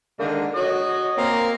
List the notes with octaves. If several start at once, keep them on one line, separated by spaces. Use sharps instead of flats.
D3 D#3 G#3 A#3
F#4 C#5 D#5
A#3 C4